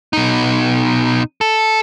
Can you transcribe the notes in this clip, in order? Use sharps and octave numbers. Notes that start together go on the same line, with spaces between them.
B2 D#4
A4